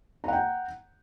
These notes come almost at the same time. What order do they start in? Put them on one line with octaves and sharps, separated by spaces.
A#5 F#5 G5